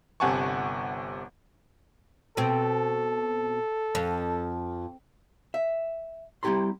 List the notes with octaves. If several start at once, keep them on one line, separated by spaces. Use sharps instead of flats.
G1 C3 F#5 G#5 A5 C#6
B2 C4 A4
F2
E5
G3 C4 E4 G4 A#5 C6